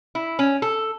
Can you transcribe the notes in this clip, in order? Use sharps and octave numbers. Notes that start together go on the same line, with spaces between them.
E4
C#4
A4